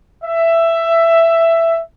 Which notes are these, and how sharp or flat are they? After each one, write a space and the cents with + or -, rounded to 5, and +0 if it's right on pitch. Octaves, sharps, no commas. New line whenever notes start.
E5 +10